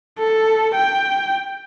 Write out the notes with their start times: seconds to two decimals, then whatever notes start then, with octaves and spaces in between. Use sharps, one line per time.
0.19 A4
0.75 G5